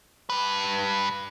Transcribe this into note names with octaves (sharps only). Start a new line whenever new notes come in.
G2 B4